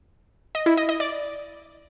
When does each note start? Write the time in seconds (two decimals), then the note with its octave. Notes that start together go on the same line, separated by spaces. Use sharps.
0.55 D#5
0.66 E4
0.77 D#5
0.89 D#5
1.00 D5